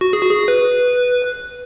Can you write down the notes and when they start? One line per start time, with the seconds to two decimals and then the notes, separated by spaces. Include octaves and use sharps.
0.01 F#4
0.13 G#4
0.22 F#4
0.30 G#4
0.48 B4